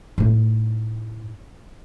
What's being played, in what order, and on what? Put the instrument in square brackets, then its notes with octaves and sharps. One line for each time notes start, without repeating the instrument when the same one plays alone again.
[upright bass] A2 D#4